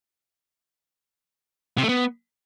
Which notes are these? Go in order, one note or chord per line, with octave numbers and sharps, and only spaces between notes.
C3
A3
B3